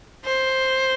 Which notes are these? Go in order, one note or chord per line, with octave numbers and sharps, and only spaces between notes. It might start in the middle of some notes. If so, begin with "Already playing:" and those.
C5